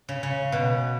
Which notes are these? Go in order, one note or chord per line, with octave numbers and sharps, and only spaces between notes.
C#3
C#3
B2